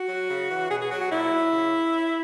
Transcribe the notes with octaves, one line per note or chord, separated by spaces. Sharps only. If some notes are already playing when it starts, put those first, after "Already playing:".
Already playing: F#4
F#3
C#3
E3
B2 G#4
G#4
F#3 F#4
F#4
A#2 E4
F#3
C#3